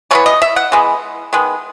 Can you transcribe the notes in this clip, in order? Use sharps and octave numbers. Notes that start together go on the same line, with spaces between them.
E3 G#3 B3 C#5
D#5
E5
F#5
E3 G#3 B3
D#3 G#3 B3